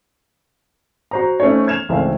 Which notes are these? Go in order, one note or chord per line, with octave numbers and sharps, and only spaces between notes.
F#4 C5 A#5
A3 C#4 D#4 C5 C#5
F6 G#6 E7 F7
G#1 C#2 E3 A3 C4 F5